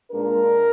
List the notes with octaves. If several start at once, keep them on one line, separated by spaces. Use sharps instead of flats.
A#2 G#3 D4 A#4